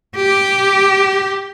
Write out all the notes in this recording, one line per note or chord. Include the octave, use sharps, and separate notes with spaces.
G4